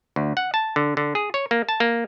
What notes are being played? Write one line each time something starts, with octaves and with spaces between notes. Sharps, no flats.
D2
F#5
A5
D3
D3
G#4
C#5
A#3
A5
A#3